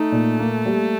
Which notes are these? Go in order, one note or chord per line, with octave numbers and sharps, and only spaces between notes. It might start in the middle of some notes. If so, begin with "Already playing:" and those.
Already playing: A3 D#4
A#2
A#3
G3